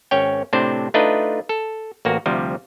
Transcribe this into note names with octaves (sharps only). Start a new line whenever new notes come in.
G#1 C#4 C#5 G5
A2 C3 C4 D4 C5
A3 D4 D#4 F4 B4 D#5
A4
A1 A#3 F#4
D2 C3 F3 G3